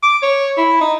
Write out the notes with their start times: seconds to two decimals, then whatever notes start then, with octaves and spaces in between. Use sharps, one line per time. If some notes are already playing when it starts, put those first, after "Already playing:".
0.03 D6
0.22 C#5
0.58 E4
0.81 D#4